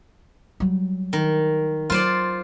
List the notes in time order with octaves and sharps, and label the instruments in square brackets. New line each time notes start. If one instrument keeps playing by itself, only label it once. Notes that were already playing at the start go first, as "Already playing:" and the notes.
[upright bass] F#3 G3
[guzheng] D#3
[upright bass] F#3 [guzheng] F4 C5 D5